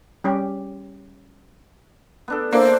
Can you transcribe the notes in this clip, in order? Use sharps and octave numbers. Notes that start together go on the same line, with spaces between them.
G3 C#4 G4
B3 D4 A4
A#3 D4 E4 C5 D5